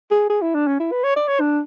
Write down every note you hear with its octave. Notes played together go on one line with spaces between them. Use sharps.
G#4
G#4
E4
D4
C#4
E4
B4
C#5
D5
C#5
D4